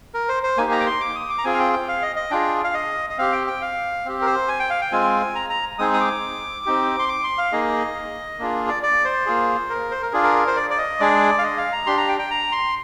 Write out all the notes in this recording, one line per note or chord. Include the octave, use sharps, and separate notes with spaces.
A#4
C5
C5
A#3 D#4 G4 G#5
A#5
D6
C6
D6
D#6
D6
A#5
C4 F4 G#4 G#5
F5
G5
G5
F5
D#5
D#5
D4 F4 G#4 G5
F5
D#5
D#5
C4 G4 F5
G5
G5
F5
C4 G4
A#4
C5
G#5
G5
F5
G5
G#3 C4 F4 G#5
A#5
A#5
G#3 C4 D#4 G#4 D#6
D#6
D6
C4 D#4 G4
C6
D6
C6
F5
A#3 D#4 G#4 D#5
A#3 D4 F4 G#4
D5
D5
C5
A#3 F4 G#4
A#4
C5
A#4
D4 F4 G#4
A#4
C5
D5
D5
D#5
G#3 D4 G#4 D5
F5
D#5
F5
A#5
D4 G4 C6
A#5
G5
G5
A#5
C6